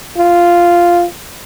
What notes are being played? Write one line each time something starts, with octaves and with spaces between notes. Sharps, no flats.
F4